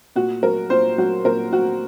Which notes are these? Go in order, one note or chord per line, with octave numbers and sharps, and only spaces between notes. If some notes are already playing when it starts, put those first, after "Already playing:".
A#2 F#4
F#3 A#4
A#2 C5
F#3 F#4
A#2 A#4
F#3 F#4